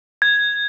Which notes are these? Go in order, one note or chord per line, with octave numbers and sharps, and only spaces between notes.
G#6